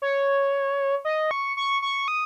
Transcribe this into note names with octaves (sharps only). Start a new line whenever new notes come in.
C#5
D#5
C#6
C#6
C#6
D#6